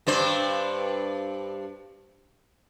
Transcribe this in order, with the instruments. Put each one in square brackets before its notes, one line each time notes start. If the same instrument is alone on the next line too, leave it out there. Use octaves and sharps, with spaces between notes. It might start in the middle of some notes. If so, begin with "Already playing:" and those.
[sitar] G2 D4 C5